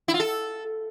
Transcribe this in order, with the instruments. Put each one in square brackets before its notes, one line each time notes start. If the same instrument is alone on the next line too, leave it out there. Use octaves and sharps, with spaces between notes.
[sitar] E4
F4
A4